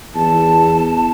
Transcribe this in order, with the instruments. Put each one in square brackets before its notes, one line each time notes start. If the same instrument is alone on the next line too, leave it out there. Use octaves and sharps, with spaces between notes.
[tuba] E2 [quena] A5